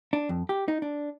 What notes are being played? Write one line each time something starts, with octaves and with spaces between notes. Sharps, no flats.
D4
F2
G4
D#4
D4